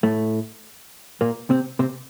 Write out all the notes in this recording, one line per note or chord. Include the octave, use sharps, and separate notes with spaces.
A2 A3
A#2 A#3
C3 C4
C3 C4